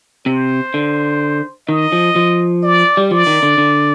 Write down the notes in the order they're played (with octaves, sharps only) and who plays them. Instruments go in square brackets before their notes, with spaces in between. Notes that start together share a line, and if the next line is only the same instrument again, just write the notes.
[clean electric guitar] C3 [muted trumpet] C5
[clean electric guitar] D3
[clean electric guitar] D#3 [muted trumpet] D#5
[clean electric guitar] F3
F3
[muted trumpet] D5
[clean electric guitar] G3
[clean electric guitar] F3 [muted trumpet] D5
[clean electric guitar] D#3
D3
D3